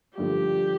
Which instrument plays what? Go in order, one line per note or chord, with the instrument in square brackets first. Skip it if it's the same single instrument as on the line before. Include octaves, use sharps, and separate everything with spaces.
[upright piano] G2 D3 F3 A3 [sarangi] G4